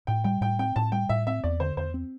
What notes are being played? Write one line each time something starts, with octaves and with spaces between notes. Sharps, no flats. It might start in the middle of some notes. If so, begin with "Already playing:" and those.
A2 G5
G3 G5
A2 G5
C4 G5
A2 A5
G3 G5
A2 E5
C4 E5
E2 D5
D3 C5
E2 C5
C4